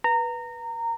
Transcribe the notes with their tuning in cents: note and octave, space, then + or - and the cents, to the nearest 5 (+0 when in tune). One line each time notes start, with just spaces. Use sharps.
B4 -15 A#5 -20